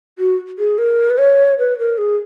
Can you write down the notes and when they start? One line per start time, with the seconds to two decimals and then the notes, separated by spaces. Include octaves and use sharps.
0.18 F#4
0.59 G#4
0.78 A#4
1.10 B4
1.18 C#5
1.59 B4
1.79 A#4
1.98 G#4